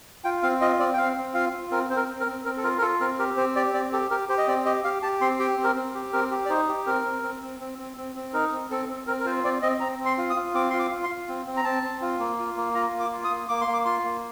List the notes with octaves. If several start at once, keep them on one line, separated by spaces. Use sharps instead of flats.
F4 G5
C4 F5
F4 D#5
C4 D5
G5
C4 F5
C4
F4 F5
F4
C4 A#4
C4 C5
A#4
C4
A#4
C4
C4 A#4
A4
F4 A#4
A#4
F4 A4
C4 A#4
G4 A#4
C4 C5
G4 D5
C4 D5
G4 A4
G4 A#4
G4 C5
D#5
C4 D5
G4 D#5
G4 F5
G4 A5
C4 C6
G4 G5
C4
A#4
C4
G4
C4 A#4
G4
D5
D#4 C5
G4
C4 A#4
C4
C4
C4
C4
C4
C4
C4
D#4 A#4
C4
C4 A4
C4
C4 A#4
A#4
F4 C5
C4 D5
C4 D#5
C4 A#5
C4
C6
F4
D#6
F4
C4 D6
F4 C6
D6
F4
C6
F4
C4
C4
A#5
C4 A5
C4
F4
A#3
F4
A#3
F4 A#5
A#3
D6
F4
D#6
A#3
A#3 D6
C6
A#3
D6
F4 C6
A#3